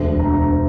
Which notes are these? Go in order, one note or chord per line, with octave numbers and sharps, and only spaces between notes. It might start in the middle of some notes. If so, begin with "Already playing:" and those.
Already playing: E1 D2 D3
A#5